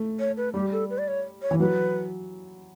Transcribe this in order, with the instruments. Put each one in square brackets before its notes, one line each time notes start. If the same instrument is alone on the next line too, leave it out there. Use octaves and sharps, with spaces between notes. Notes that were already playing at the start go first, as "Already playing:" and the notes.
Already playing: [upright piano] A3
[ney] C#5
B4
[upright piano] G3 [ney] G4
[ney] A4
B4
D5
C#5
C#5
[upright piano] E3
[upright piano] F#3 [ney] B4